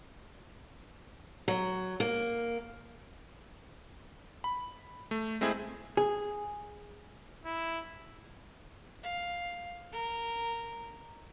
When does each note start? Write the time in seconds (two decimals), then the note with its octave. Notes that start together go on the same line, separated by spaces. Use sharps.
1.48 F#3
2.00 A#3
4.44 B5
5.11 A3
5.41 G#3 A3 C4 E4 G#4
5.97 G#4
7.45 E4
9.03 F5
9.92 A#4